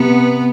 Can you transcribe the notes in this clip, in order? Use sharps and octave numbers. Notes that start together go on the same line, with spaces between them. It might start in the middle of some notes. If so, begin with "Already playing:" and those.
Already playing: C3 B3